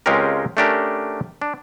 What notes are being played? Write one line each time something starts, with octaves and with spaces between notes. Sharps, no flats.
C#2 G#3 C4 C#4 G4 A#4
A3 C#4 D4 G4 A#4
D4